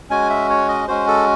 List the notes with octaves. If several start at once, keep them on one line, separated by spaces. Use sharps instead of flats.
G#3 C#4 F#4 G#5
E5
C#5
D#5
G#3 C#4 F#4 C5
A4